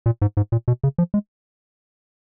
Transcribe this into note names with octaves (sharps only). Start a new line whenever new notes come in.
A#2
G#2
G#2
A#2
B2
C#3
F3
G#3